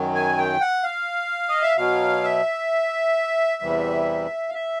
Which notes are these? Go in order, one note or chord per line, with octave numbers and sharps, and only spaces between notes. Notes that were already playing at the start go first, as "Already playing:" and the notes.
Already playing: F#2 D#3 F#3
G#5
G5
F#5
F5
D#5
E5
B2 F#3 F5
E5
E2 C3 E3 G3
F5
E5